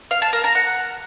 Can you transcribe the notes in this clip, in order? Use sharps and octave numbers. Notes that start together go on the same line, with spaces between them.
F5
A5
A#4
A#5
F#5